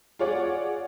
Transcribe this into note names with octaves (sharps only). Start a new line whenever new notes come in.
F4 G#4 C#5 D5 F#5